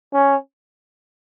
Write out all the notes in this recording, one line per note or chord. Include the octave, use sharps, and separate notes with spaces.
C#4